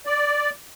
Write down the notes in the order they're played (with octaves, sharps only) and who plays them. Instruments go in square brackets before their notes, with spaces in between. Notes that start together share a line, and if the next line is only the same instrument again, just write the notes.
[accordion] D5